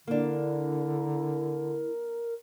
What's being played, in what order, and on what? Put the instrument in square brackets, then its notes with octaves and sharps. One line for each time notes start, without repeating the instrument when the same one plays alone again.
[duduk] D3 [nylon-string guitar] A#3 D4 [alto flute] E4 [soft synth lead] A#4